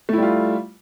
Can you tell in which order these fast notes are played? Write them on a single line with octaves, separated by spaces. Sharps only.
A3 E4 G3 F4